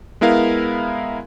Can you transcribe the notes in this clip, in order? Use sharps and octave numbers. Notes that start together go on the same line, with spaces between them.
G#3 B3 E4 A#4 F5